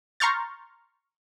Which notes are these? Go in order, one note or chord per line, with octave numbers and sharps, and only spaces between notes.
A#5 C6 C#6 F6 G6 A6